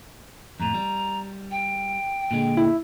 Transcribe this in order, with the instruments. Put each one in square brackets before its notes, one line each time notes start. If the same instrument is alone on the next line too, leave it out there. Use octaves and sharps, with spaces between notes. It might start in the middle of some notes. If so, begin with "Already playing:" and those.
[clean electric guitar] F2 A2 [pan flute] A#5
[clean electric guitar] G3
[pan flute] G5
[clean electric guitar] A#2 D3 G#3
[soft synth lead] E4